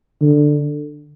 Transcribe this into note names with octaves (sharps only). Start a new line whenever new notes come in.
D3